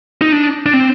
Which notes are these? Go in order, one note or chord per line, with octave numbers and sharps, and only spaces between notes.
D#4
D4
D4
C4